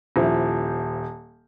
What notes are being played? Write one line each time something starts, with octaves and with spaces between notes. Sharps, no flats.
D#1 F3 E4